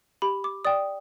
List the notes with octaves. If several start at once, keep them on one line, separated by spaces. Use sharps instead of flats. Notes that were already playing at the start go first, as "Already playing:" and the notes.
G4 B5
D6
D5 G5 D#6